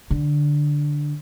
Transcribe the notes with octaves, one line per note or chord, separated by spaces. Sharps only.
D3